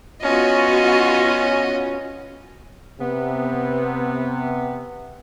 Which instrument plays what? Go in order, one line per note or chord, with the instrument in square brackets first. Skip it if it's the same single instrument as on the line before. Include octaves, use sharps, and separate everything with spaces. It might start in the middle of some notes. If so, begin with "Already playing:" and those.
[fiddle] B3 D#5 [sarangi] C#4 [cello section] F4 F#4
[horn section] C3 B3